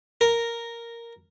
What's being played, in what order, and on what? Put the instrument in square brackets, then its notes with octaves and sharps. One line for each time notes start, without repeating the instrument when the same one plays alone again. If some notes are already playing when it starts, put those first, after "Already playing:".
[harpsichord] A#4